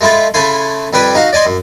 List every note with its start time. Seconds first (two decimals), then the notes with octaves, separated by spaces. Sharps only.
0.01 G#3 A3 E4 F4 A4
0.34 C#3 A3 E4 A4 G#5 C6
0.93 F2 G3 B4 G5 G#5
1.15 D#4 F#4 F5
1.33 D5 D#5 G#5 C6
1.46 F#2